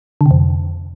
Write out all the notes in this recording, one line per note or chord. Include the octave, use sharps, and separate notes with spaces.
D3
C3
F2